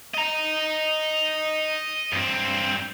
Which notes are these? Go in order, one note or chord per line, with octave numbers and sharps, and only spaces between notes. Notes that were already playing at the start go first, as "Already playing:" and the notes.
D#5 A#5
G2 C4